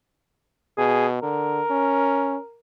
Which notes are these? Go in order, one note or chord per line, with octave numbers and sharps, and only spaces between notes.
B2 G#4
D3 A#4
C#4